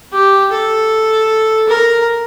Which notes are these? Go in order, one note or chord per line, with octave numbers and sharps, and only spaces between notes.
G4
A4
A#4